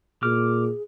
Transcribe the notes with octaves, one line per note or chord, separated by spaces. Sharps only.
A#2 G#4 D6 F6